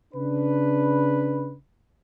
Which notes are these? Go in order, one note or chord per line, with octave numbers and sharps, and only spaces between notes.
C#3 D4 B4